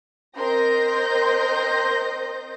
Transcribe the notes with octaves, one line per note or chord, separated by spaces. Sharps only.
C4 A#4 D#5 C6 G6 A#6